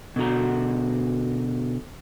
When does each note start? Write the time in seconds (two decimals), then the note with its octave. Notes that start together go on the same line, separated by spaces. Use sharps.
0.16 B2 D3 F#4 A#5